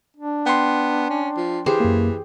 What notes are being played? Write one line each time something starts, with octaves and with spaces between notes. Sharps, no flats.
D4
B3 G5 C6
C#4
F3
E3 G4 G#4 C5
F#2 A#3